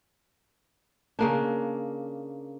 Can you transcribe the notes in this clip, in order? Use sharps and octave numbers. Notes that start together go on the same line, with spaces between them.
C#3 A#3 D4